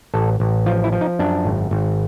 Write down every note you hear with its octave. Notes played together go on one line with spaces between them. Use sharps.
A1 A4
A1
F3 F4
E4
F3
D#4
F#2 D4
G#1
G#1